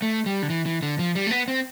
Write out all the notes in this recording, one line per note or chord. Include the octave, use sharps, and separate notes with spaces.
A3
G3
D3
E3
E3
D3
F3
G3
A3
B3
C4